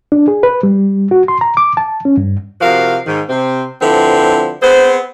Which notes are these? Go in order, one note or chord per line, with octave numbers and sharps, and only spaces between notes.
D4
G#4
B4
G3
F#4
C6
A#5
D6
A5
C#4
G2
C3 F3 F#4 A#4 F5
G#2 D#3
C3 C4
D3 F3 C4 E4 B4
B3 C4 G#4 C5